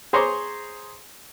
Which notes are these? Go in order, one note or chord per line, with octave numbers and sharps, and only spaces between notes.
G#4 C5 C#5 A#5 C6 D6